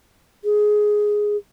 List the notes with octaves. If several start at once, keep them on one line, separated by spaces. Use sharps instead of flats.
G#4